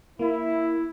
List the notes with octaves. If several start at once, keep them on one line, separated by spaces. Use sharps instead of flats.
A#3 E4